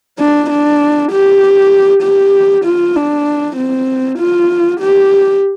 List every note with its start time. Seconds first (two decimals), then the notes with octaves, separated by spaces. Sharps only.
0.19 D4
0.51 D4
1.11 G4
2.03 G4
2.65 F4
2.96 D4
3.57 C4
4.19 F4
4.81 G4